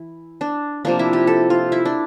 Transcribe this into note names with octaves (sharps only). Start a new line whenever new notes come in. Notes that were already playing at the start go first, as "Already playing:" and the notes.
Already playing: E3 E4
D4
C3 F3 A#3 D4
E4
G4
A4
F4
E4
D4